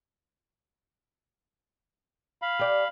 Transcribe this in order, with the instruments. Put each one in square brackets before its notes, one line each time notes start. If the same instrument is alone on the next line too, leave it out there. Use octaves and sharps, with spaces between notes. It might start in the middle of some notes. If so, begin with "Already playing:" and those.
[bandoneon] F5 B5
[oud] G4 D5